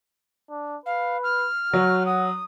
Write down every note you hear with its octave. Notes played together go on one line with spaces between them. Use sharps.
D4
B4 F5
F6
F#3 F#4
F#5 D#6